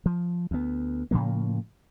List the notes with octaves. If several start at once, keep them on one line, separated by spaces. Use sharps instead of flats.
F3
D2 B3
A2 C#3 F3 A#3